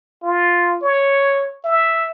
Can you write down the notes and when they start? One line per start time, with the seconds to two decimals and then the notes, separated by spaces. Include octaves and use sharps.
0.23 F4
0.82 C#5
1.65 E5